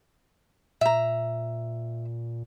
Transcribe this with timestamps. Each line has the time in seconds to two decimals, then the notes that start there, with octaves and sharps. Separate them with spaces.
0.81 A#2 E5 A#5